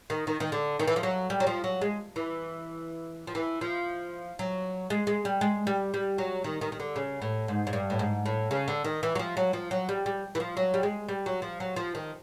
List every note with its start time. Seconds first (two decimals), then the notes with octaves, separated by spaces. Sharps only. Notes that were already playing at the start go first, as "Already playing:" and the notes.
0.10 D#3
0.27 D#3
0.40 D#3
0.52 D3
0.79 D#3
0.87 E3
0.96 F3
1.03 F#3
1.30 G3
1.40 F#3
1.47 F3
1.64 F#3
1.81 G#3
2.16 E3
3.27 F3
3.35 E3
3.61 F3
4.39 F#3
4.90 G#3
5.07 G#3
5.25 G3
5.41 G#3
5.67 G3
5.94 G3
6.18 F#3
6.44 D#3
6.61 D#3
6.72 D#3
6.80 D3
6.96 C#3
7.22 A2
7.48 G#2
7.67 G#2
7.73 G2
7.90 A2
7.99 G#2
8.26 A2
8.51 C#3
8.68 D3
8.84 D#3
9.03 E3
9.15 F#3
9.19 F3
9.37 F#3
9.53 F3
9.71 F#3
9.89 G3
10.06 G3
10.35 E3
10.40 F3
10.57 F#3
10.74 G3
10.83 G#3
11.09 G3
11.26 F#3
11.42 F3
11.60 F#3
11.76 F3
11.95 D#3